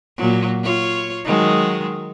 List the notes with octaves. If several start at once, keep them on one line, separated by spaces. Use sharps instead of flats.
A#2 F#3
F4 C#5
D#3 F#3 G#3